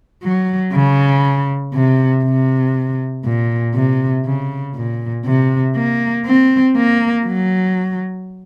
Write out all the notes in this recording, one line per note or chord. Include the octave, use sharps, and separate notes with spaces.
F#3
C#3
C3
C3
A#2
C3
C#3
A#2
C3
A#3
C4
A#3
F#3